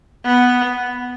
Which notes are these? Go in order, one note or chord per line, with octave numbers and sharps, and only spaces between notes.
B3